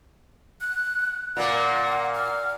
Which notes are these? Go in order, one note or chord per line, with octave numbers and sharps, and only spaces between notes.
F#6
A#2 A#3 F#5
F6